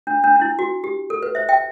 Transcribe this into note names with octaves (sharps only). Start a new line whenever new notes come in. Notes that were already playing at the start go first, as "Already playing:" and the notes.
D4
D4
D4
E4
F#4
G4
A4
B4
C5 E5
E5 G5